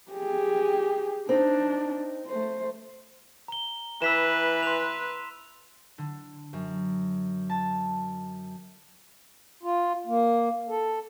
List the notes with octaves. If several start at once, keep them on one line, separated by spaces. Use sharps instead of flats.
G4 G#4
C4 D4 D#4
A3 C5
A#5 G7
E3 B4 E6 B6 E7
C6 F7
D3
F#2
A5
F4
A#3
A4